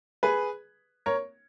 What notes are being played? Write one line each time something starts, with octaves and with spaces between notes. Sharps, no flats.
G#4 B4
A#4 C#5